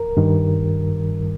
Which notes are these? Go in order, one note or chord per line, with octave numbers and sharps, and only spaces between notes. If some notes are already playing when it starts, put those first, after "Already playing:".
Already playing: A#4
G2 D#3 G3